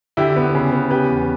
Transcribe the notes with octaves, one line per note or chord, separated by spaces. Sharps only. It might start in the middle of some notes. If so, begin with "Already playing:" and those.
D3 E4 G4
B3
C#3
B3
C#3 G4 B4
E2